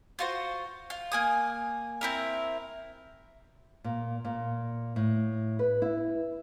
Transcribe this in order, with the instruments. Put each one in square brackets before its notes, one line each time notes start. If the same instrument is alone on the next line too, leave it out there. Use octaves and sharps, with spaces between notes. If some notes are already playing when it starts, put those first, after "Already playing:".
[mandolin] F4 F#4 C5
F4
A#3 G#5 D#6
C4 E4 A#4
[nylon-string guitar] A#2
A#2
A2
B4
E4